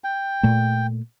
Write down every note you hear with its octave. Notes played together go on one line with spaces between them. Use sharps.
G5
A#2 A3